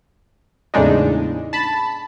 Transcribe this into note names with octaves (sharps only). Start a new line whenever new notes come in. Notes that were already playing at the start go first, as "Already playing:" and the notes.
E2 A2 C#3 G#3 D4 D#4
A5 B5